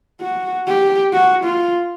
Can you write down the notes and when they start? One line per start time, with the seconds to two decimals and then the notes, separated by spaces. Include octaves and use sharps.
0.20 F#4
0.67 G4
1.13 F#4
1.44 F4